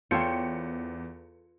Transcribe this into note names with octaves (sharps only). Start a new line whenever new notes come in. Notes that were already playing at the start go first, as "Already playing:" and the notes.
E2 F4 A4 C5 C#5 G5 C#7